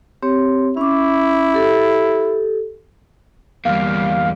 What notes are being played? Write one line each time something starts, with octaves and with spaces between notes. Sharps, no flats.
C4 G4 C#5
C#4 E4 D6
G4 A4
E2 G3 A#3 F5